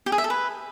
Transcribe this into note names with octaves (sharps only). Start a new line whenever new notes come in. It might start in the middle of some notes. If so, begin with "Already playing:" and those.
G4
G#4
E5
A4
B4